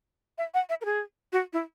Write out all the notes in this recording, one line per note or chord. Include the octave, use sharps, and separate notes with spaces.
E5
F#5
E5
A#4
G#4
F#4
E4